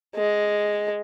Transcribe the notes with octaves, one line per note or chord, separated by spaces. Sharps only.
G#3